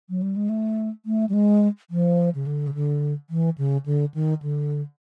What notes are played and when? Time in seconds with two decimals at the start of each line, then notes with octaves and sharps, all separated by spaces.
0.09 F#3
0.22 G3
0.36 G#3
0.49 A3
1.06 A3
1.29 G3
1.33 G#3
1.90 F3
2.35 C#3
2.47 D3
2.67 C#3
2.74 D3
3.30 E3
3.58 C#3
3.86 D3
4.14 D#3
4.42 D3